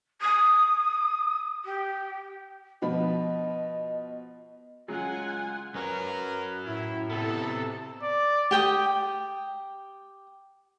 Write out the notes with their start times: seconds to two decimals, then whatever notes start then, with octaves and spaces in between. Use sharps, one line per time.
0.22 D#6
1.65 G4
2.82 B2 F3 D#5 B5
4.88 C#3 F#3 G#3 F4 F#5 G#5
5.75 F#2 F#3 A#4 B4 C#5
6.65 A2 E4
7.10 C3 B3 A4
8.02 D5
8.51 G4 G5 G#5 D#6